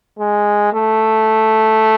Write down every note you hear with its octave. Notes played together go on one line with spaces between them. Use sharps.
G#3
A3